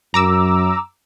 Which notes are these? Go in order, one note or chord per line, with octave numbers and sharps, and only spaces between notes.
F#2 A#5 D6 E6